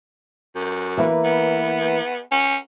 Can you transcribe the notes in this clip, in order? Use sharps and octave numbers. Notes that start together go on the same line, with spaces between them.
F#2
E3 A#3 B4
B3
C#4